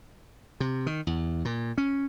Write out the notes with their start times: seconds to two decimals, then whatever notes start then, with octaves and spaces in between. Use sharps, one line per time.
0.60 C3
0.86 D#3
1.07 E2
1.45 A#2
1.78 C#4